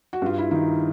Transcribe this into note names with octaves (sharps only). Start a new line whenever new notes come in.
F#4
G2 F4
E4
D#3 D#4